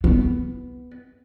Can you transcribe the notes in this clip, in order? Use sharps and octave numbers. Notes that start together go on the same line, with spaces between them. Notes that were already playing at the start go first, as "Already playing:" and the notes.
B3